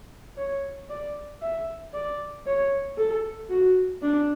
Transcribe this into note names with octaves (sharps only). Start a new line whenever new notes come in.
C#5
D5
E5
D5
C#5
A4
F#4
D4